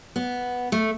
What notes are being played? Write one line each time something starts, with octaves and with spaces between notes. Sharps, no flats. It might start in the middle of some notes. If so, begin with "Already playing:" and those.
B3
A3